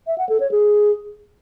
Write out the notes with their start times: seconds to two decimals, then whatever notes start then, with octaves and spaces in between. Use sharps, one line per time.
0.07 E5
0.18 F#5
0.29 A4
0.40 C#5
0.51 G#4